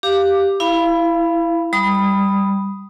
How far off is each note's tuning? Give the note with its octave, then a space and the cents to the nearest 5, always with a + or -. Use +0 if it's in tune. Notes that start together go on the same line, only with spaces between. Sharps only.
G4 +0 F5 +0 D6 +10
E4 +5 F5 -25 B5 +0
G3 +0 B5 +0 D#6 +0